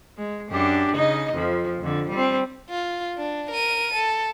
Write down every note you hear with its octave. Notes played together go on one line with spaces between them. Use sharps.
G#3
F#2 D4 G4
C#3 D#4 D#5
F2 F3
F2 D3
G3 C4
F4
D4
A#4 D#7
A4